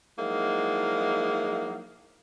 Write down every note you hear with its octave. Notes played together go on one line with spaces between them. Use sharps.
F3 F#3 G#3 A#3 D#4 E4